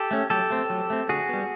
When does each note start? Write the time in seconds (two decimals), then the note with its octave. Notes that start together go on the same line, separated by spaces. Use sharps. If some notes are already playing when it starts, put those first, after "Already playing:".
Already playing: G4 A4
0.11 A3 C#4
0.30 F#3 G4 A4
0.50 A3 C4
0.70 F#3
0.90 A3 C4
1.09 D3 F#4 G#4
1.29 G3 B3